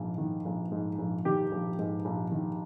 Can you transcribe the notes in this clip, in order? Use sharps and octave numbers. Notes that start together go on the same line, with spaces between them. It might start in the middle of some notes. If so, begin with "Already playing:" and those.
Already playing: A#1 G#2
D#3
A#1
G#2
A#1
D#3 G4
A#1
G#2
A#1
D#3